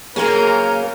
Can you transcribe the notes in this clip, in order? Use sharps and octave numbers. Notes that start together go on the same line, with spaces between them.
C#3 F#3 A#3 C#4 G#4 A#4 C5 G#5